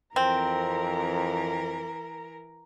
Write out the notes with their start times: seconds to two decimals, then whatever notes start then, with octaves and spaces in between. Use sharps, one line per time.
0.16 F2 E3 C4 A#4 A#5